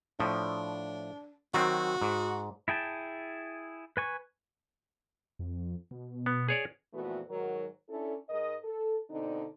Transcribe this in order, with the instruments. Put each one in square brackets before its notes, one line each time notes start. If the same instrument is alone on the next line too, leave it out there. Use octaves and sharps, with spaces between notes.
[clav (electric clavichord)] A2 F3 [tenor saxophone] D4
[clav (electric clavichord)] D#3 F#3 C4 [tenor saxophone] F#4
[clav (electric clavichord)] G#2
[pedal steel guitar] E4 G#4 G5 A5
B4 G#5 C#6
[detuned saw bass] F2
B2
[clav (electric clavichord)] B3
G#4 C#5 D5
[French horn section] F2 A#2 E3 A3 B3 F#4
G#2 D#3 F#3 F#4 A#4
C#4 D4 E4 A4
G#2 G#3 A#4 D#5
A4
B2 D3 C4 D4 D#4